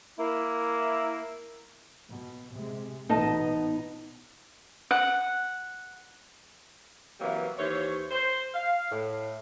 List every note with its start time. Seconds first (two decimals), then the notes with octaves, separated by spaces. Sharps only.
0.19 A#3 E4
2.08 B2
2.52 C3 G#3
3.09 A1 B2 B3 D#4 D#5 A5
4.91 F#5
7.20 C3 E3 F#3 G3 A#3 B3
7.59 D#2 E3 C5 C#5
8.11 C5
8.54 F5
8.92 A2